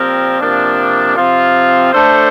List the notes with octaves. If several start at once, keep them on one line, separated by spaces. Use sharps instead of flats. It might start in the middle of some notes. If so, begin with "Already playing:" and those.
Already playing: A#2 F3 C4 G4 A#4
C3 F3 A#3 D4
C3 F3 C4 F4
A3 D4 A4 C5